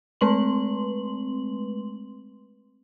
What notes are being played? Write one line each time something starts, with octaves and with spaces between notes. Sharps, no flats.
G#3 A3 C4 B4 C6 F#7